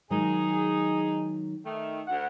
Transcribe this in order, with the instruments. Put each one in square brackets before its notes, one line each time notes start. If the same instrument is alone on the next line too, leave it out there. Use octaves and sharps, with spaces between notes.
[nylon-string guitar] D#3 F#3 G#3 [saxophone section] D#4 G#4
[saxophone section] D#3 A3
D2 F#5